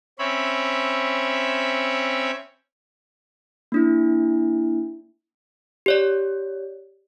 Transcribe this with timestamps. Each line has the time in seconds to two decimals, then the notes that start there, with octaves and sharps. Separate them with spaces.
0.19 C4 C#4 C#5 E5 B5
3.72 A#3 D4 E4
5.86 G4 C#5 D5